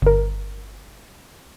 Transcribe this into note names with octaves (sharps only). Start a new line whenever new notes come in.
G1 A#4